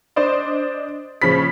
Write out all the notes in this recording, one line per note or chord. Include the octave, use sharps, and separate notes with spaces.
D4 C5 D5 D#5
A#1 C#3 F3 C#5 B5 B6